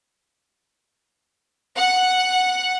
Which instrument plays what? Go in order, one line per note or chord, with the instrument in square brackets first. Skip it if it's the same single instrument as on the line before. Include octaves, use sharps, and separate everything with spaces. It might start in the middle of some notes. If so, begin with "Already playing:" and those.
[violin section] F#5